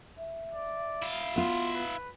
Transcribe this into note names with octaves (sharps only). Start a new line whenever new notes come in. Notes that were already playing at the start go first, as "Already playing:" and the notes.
E5
D5
E4 F5
B3 F4 C6
B4